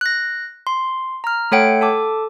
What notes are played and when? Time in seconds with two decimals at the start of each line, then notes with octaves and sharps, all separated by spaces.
0.01 F#6 A#6
0.67 C6
1.24 A#5 F6
1.52 A3 A4 C#5 F#5 G5 D7
1.81 A4 A5 D6